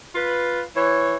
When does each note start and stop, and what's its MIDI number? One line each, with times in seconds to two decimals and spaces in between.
0.15 0.61 65
0.15 0.61 71
0.74 1.15 52
0.74 1.15 73